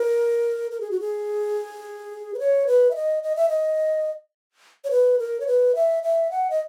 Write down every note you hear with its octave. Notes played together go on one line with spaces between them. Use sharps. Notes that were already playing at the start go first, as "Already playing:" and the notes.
Already playing: A#4
A#4
G#4
F#4
G#4
B4
C#5
B4
E5
D#5
D#5
E5
D#5
C#5
B4
A#4
C#5
B4
E5
E5
F#5
D#5